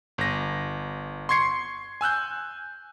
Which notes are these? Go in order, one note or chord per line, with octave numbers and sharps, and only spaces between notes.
G1 A#6
C6 C#6 G#6 C7 C#7
G#5 E6 F#6 G6